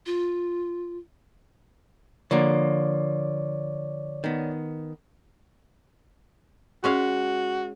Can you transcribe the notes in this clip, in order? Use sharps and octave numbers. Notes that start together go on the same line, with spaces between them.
F4
D3 F3 A#3 C#5 D5
D#3 B3
G#3 C#4 F#4 F5